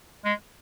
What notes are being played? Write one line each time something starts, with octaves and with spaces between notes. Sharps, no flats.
G#3